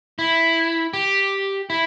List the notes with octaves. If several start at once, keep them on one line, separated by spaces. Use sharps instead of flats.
E4
G4
E4